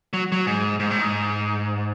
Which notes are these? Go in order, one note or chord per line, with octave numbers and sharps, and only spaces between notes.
F#3
F#3
G#2
G#2
A2
G#2